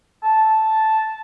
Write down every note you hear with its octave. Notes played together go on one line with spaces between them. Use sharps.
A5